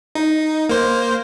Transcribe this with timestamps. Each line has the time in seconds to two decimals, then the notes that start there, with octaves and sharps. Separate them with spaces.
0.15 D#4
0.69 A#3 C5